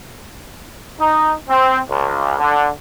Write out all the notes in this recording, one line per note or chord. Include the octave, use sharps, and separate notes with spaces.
D#4
C4
C#2
D3